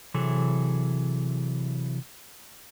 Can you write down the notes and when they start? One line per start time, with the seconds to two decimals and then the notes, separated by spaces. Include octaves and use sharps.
0.14 C3 E3 F#3 G#4 A4